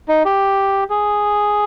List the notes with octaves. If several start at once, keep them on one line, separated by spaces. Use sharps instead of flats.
D#4
G4
G#4